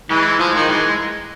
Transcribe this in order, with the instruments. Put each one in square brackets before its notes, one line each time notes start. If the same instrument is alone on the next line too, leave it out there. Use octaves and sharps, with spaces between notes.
[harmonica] E3 [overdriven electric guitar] G#3
[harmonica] F3 [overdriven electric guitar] G#3
[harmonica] D#3
[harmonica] E3 [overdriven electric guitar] G#3